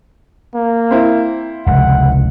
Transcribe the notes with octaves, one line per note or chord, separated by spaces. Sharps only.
A#3
C4 E4
F1 C#2 F#5